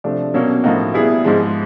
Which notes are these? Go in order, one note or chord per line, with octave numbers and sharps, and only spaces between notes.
C3 F3 A3 D4
B2 F#3 A#3 C#4
A2 F3 A#3 D#4 F#4
G3 B3 E4 G#4
G#2 F3 G#3